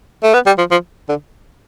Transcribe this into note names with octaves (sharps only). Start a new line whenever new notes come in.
A3
B3
G3
F3
F3
D3